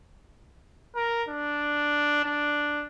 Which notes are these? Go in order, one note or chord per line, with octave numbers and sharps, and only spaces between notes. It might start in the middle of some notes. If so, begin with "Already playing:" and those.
A#4
D4
D4